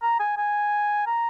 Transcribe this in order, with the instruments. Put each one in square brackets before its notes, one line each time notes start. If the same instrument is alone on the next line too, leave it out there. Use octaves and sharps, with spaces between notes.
[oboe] A#5
G#5
G#5
A#5